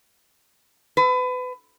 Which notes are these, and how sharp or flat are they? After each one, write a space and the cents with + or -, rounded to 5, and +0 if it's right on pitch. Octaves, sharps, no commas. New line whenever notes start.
B4 +30